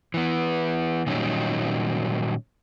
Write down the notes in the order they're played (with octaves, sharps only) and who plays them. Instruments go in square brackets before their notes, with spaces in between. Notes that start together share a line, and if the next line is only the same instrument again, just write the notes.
[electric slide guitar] E3 B3
A#2 D#3 F#3 G3 C#4 D#4